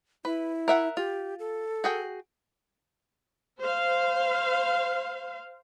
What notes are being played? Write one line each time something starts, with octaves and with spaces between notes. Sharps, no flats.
E4 B4
A#4 E5 F#5
F4 G4
A4
F#4 G#4 G5
C5 F5